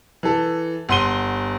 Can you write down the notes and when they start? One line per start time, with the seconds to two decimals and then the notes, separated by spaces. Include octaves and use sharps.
0.23 E3 A4
0.89 G1 F#5 C6 D#7 G7